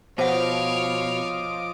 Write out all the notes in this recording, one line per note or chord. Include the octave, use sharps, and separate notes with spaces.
B2 F3 C5 C#5 D#5 F5 F#5 D6